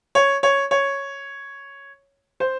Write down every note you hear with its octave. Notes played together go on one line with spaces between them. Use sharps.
C#5
C#5
C#5
C5